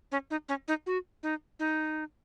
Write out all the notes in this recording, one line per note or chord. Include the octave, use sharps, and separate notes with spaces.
C#4
D#4
C#4
D#4
F#4
D#4
D#4